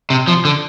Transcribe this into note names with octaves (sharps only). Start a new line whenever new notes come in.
C3
F3
D3